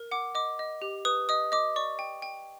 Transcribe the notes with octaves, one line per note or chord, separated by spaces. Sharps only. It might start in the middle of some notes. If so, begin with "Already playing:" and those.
Already playing: A#4
F#5 D6
D#5 D6
D#5
G4
B4 D#6
D#5 D#6
D#5 D6
D5 C#6
G5
G5